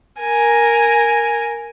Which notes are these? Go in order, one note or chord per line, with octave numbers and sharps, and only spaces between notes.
A#4 G#5